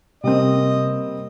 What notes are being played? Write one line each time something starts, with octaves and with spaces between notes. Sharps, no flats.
C3 G3 A#3 C4 D#5